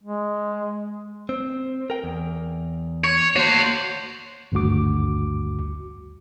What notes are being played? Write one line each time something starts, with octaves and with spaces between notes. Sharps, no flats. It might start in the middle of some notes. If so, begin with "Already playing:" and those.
G#3
C4
A#4 G5
E2
C#5
A#3 F#4 C5 C#5
G#1 D2 G2 F#4 D6